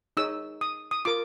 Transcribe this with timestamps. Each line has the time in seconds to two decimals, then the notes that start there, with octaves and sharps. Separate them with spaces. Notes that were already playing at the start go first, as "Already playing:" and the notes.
0.17 D#4 G#4 C#5 E6
0.61 D#6
0.91 D#6
1.05 F4 A#4 D6